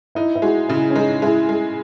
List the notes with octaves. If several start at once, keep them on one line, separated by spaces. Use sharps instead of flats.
D#4 E4
E4
G#3 F#4
C#3 E4
C#4
G#3 D#4
G#3 E4
G#3